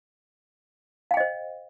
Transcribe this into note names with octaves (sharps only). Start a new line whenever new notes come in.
C5 D#5 F5 G5